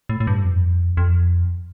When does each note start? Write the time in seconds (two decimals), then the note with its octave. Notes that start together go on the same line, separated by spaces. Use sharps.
0.09 A2
0.20 A2
0.27 G2
0.45 F2
0.97 F2